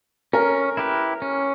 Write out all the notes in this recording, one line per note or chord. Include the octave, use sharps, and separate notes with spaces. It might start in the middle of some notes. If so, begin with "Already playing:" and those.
C#4 A#4
E4 G4 B4
C#4